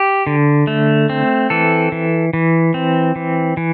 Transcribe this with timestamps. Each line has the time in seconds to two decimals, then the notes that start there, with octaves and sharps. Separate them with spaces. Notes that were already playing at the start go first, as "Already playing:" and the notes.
Already playing: G4
0.27 D3
0.67 A3
1.10 C4
1.50 E3 A4
1.92 E3
2.33 E3
2.74 C4
3.16 E3
3.57 E3